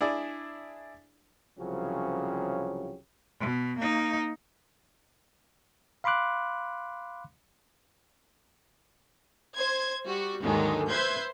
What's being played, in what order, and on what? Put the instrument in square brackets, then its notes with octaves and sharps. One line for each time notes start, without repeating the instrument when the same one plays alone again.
[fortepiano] D4 E4 G#4 D5
[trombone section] C2 C#3 F3 F#3 C#4 G4
[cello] B2
A#3 D#4
[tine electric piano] F5 B5 C6 D6 F#6
[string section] C5 G#6
G3 F#4
D#2 G#2 D3 D#3 F#3 G#3
B4 C5 E5 C6 G6 G#6